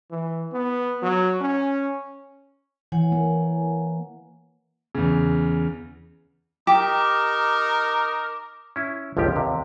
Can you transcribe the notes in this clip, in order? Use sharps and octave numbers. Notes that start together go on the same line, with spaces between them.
E3
B3
F#3
C#4
E3 C#5 F#5 G#5
A#3
E2 C#3
D#4 G4 A#4 D6
C#4 E4
G1 C#2 F3 G3 G4
D#2 C3